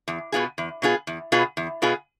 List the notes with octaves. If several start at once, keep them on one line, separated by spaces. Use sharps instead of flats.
E2
B2 B3 F4 G#4
E2
B2 B3 F4 G#4
E2
B2 B3 F4 G#4
E2
B2 B3 F4 G#4